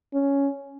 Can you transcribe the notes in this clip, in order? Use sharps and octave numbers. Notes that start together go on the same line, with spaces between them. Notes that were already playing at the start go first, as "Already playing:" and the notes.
C#4